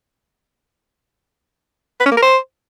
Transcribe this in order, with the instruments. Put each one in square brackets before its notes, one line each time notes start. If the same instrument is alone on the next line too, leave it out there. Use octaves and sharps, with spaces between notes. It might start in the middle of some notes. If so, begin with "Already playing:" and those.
[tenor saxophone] B4
C#4
A#3
A#4
C5